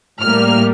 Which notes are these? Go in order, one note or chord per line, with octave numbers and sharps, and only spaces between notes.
A2 G3 A#3 F6